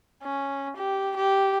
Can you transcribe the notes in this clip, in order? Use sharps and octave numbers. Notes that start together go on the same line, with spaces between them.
C#4
G4
G4